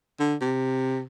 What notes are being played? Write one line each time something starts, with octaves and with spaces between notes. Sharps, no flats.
D3
C3